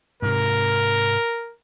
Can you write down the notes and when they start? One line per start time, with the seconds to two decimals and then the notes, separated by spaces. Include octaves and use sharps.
0.22 G#2 C3 A#4